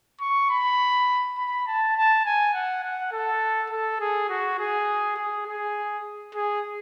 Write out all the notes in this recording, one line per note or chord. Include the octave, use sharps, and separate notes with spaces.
C#6
B5
B5
A5
A5
G#5
F#5
F#5
A4
A4
G#4
F#4
G#4
G#4
G#4
G#4